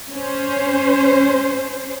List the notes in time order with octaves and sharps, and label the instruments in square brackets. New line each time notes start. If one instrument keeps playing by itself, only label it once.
[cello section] C#4 C5